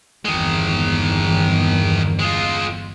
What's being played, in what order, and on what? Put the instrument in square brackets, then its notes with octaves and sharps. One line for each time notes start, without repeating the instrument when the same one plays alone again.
[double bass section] G1 E2 [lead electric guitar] D#3 G#3
[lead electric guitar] G#3 F4